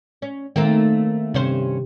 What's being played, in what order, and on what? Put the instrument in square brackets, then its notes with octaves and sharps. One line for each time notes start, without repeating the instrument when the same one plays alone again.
[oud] C#4
[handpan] D#3 [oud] A3 A#3 C4
[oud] G2 C#4 C5 [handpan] C3